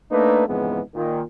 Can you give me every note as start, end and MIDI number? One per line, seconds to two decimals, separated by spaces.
0.12 0.46 57
0.12 0.46 58
0.12 0.46 62
0.12 0.46 63
0.12 0.46 71
0.48 0.81 41
0.48 0.81 44
0.48 0.81 49
0.48 0.81 52
0.48 0.81 56
0.48 0.81 59
0.95 1.23 46
0.95 1.23 51